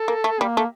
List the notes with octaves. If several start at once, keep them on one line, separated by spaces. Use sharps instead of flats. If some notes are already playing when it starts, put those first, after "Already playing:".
Already playing: A4
A#3
A3
G3 A#3
A3